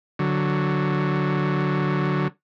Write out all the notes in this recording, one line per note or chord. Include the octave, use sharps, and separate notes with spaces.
D3 F#3